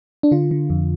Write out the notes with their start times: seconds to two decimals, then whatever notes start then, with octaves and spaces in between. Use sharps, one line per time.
0.23 D4
0.31 D3 F4
0.51 D3
0.70 F2